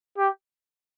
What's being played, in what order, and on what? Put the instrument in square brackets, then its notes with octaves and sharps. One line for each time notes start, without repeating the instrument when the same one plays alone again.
[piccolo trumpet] G4